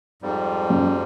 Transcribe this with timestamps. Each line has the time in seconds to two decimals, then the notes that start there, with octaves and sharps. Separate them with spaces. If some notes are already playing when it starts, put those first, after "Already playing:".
0.22 F2 G#2 G3
0.70 F#2